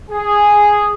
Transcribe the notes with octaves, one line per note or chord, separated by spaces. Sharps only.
G#4